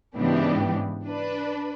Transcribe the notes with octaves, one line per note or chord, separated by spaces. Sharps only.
G#2 C#3 E3 B3 D4 G4
D4 B4